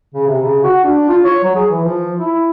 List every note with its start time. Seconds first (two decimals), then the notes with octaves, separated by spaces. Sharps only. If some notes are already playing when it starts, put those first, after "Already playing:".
0.14 C#3
0.28 C3
0.42 C#3
0.64 F#4
0.84 D4
1.09 F4
1.24 C#5
1.43 F#3
1.55 G#4
1.70 E3
1.84 F3
2.17 E4